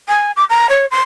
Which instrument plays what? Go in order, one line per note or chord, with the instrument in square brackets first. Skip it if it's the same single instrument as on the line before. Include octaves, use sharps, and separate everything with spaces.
[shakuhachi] G#5
D6
A#5
C#5
C6